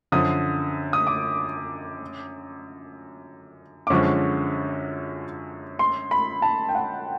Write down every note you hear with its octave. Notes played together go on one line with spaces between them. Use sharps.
F#2 D3 F3 D#6
D#6
D6
D6
F#2 D3 F3 G#3 C#4 C#6
C6
B5
A5
G5
F#5